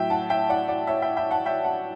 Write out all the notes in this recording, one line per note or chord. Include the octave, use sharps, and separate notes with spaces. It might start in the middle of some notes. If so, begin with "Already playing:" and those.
Already playing: A2 F#3 E5 G5
F#5 A5
E5 G5
D5 F#5
D5 F#5
C#5 E5
E5 G5
E5 G5
F#5 A5
E5 G5
F#5 A5